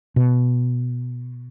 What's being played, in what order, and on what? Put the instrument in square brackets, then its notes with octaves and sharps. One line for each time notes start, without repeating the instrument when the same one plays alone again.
[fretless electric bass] B2